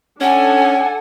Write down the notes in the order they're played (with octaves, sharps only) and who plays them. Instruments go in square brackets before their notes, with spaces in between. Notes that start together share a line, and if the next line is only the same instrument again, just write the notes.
[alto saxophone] C#4 [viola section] D4 A4 G#5 [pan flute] F#5